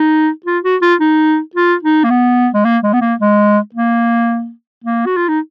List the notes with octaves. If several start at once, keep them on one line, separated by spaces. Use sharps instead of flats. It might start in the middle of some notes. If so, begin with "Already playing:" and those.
Already playing: D#4
F4
F#4
F4
D#4
F4
D#4
A#3
B3
G#3
A#3
G#3
B3
A#3
G#3
A#3
A#3
F#4
F4
D#4